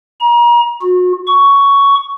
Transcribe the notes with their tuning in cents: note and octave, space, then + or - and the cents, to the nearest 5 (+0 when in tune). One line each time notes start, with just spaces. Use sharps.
A#5 +35
F#4 -35
C#6 +10